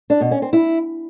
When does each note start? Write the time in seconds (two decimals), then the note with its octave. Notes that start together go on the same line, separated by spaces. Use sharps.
0.10 D4
0.21 B2
0.31 C#4
0.42 C4
0.53 E4